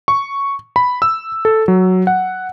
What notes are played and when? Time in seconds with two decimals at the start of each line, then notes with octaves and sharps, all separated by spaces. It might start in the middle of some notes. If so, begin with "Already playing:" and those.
0.08 C#6
0.76 B5
1.02 E6
1.45 A4
1.68 F#3
2.07 F#5